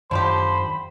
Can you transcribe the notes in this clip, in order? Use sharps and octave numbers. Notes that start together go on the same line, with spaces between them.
F#2 D3 D#3 F3 G4 C5 B5